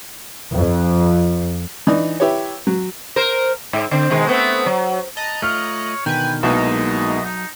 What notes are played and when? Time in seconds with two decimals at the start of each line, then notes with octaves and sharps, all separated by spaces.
0.54 F2
1.87 E3 D4 D#4
2.20 E4 G4 B4 C#5
2.67 F#3
3.16 A#4 C5
3.73 G#2
3.91 D3 C4
4.10 B2 D#3 G#3
4.27 A3 B3 C4
4.66 F#3
5.17 D#5 A5 A#5 F#6
5.42 A3 F4 C#5 F6
6.06 B2 D3 D#3 B4 G5 G#5
6.43 C2 B2 F#3 G#3 A#3 D#4 A4 D#5
7.25 D#4